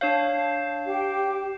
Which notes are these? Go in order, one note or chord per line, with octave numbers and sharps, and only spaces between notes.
D4 C#5 F5 G6 C7 E7
G4 G5